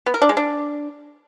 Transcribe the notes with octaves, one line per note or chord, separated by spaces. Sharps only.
B3
A#4
D4
G#3
D4